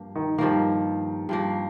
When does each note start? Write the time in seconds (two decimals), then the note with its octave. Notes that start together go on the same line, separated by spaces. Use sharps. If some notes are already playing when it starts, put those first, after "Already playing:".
Already playing: G2 F3 A#3
0.15 D#3
0.38 G2 D#3 F3 A#3
1.29 G2 F3 A#3